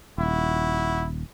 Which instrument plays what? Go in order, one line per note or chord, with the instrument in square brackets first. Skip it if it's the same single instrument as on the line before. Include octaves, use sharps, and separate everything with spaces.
[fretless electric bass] D#1 [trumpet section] E4 F#4